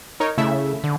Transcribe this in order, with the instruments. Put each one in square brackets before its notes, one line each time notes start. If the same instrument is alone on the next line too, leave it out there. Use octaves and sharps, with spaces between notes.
[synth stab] D#4 A#4 C#5
[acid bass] C#3 [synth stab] A3 E4 E5
[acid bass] D3